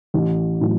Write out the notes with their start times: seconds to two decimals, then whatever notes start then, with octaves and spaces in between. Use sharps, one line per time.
0.14 A1
0.61 A2 F#3